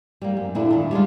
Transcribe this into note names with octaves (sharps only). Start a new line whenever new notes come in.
G3 A#3
F#2
A#2 D3 D4 E4
D#3 D4
G3 G#3 D4 F4